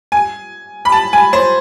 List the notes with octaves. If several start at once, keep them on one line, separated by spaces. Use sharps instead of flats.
G#5
B5
A5
G#5
C5